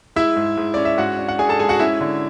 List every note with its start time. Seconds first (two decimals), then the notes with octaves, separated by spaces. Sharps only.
0.16 G#3 E4 E5
0.36 G#2
0.57 G#2
0.74 C#4 D5
0.85 E5
0.98 G#2 F#4 F#5
1.19 D4
1.29 F#5
1.39 D4 G#4 G#5
1.49 A4 A5
1.59 G#2 G#4 G#5
1.69 F#4 F#5
1.79 C#4 E4 E5
2.01 D3